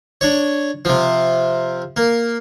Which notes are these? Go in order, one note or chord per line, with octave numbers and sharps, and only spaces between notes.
D4 C#5
C3 F3
A#3